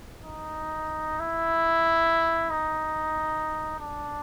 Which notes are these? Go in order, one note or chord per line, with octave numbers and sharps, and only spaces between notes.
D#4
E4
D#4
D4